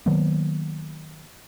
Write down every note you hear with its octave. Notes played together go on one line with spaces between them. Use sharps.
D#3 F#3 A#3 B3